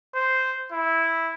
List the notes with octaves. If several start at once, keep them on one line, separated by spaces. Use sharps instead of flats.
C5
E4